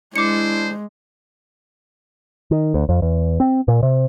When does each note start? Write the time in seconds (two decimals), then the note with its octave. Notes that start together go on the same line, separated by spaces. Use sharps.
0.16 G#3 D4 E4 C5 D6 C#7
2.51 D#3
2.74 D2
2.89 F2
3.02 E2
3.40 C4
3.68 A#2
3.83 C3